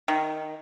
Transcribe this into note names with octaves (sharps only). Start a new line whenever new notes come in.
D#3